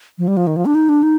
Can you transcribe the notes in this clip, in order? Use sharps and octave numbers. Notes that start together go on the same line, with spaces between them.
F3
G3
F3
D#3
F3
D4
D#4
D4
D#4